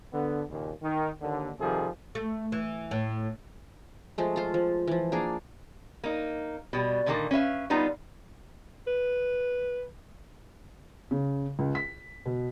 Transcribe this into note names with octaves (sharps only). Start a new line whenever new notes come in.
D3 B3
D#2 A#2 C#3
D#3
D#2 D3
C3 D#3 F3 G3 G#4 A4
A3
E3
A2
F3 G#3 A3
F4 C5
F3
E3 F3
A#3 D4 G#4
A#3 D#4
B2 G3
A#2 D3 D#3 F#3 A#3 A4
C#4 B4 E5 F5
G3 B3 D#4 F4
B4
C#3
C#2
B6
B2